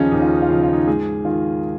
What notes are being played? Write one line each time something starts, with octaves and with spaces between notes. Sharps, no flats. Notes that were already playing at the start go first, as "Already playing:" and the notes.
Already playing: D#2 C#3 F3 C#4 D#4 G#4
D#2 D#4
F4
D#4
F4
C#3 F3 D#4
F4
D#4
G#2 G#4
D#3 F4